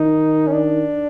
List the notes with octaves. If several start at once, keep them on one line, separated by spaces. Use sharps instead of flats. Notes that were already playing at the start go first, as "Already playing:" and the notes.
Already playing: D#3 D#4
C#4
D4